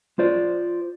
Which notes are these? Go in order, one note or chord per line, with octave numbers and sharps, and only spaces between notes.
F4 C5 D5